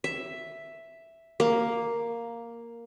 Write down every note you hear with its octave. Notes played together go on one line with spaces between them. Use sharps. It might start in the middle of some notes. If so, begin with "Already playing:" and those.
E5
A#3